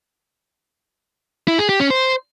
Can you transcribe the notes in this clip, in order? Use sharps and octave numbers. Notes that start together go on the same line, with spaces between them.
E4
G#4
G4
C#4
C5